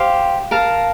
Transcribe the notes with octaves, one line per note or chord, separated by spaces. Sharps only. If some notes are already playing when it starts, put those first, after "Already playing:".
Already playing: G4 C5 F5
A#4 F5 A5